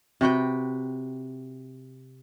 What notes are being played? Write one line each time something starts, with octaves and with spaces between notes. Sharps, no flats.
C3 F#4 B4 G5